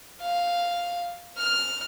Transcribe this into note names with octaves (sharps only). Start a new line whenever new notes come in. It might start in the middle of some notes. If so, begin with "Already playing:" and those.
F5
F6